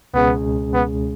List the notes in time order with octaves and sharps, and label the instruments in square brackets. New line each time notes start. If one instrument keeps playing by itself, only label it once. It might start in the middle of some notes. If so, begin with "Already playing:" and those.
[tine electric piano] C#2 B2 G#3 C#4 G#4 [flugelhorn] B3
[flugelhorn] B3